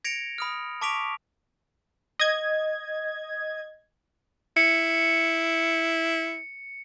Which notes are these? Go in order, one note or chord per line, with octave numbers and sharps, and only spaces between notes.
G#6 A#6 C#7 D7 F7
B5 D#6 F6
A5 C#6 D6 B6 D7 F7
D#5 G#6
E4 C#7